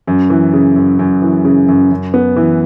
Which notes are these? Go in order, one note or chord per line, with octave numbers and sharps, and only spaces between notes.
F#2
E3
C#3
F#2
F#2
E3
C#3
F#2
F#2
B3
E3